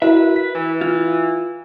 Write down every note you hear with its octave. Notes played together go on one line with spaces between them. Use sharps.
E4 F#4 A#4 B4 E5
B6
E3
F4